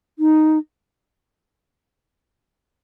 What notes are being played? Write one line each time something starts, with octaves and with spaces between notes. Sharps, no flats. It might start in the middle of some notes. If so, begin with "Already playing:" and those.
D#4